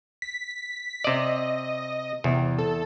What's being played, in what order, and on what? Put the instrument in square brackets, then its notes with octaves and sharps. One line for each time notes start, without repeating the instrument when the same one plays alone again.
[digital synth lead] B6
[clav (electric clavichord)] C3 D5 [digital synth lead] D#5
[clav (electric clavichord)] E2 [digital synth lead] C3
[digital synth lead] A4